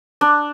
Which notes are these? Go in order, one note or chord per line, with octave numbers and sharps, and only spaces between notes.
D4